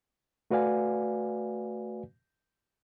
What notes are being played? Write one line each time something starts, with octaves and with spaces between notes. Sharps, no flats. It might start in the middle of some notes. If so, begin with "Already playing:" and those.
A3 F#4 B4 D5 F5 G#5